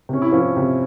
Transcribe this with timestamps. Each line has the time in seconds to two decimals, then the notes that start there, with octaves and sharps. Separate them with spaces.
0.09 C3 C#4
0.22 E4
0.32 F3 C#4
0.57 C3